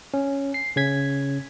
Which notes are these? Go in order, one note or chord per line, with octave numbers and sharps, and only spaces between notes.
C#4
C7
C#3 C#4 G#6 B6